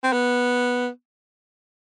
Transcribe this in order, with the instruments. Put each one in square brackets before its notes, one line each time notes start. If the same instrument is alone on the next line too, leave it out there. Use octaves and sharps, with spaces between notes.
[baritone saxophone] C4
B3